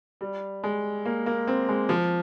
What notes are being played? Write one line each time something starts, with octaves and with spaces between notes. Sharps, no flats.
G3
G#3
A#3
A#3
C4
G#3
F3